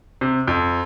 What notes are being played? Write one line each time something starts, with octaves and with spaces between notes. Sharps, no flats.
C3
F2